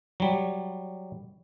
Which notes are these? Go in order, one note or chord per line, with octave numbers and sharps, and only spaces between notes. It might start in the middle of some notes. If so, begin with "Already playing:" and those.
F#3 G3